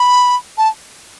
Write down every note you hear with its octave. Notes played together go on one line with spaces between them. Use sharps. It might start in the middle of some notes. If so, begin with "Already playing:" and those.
Already playing: B5
A5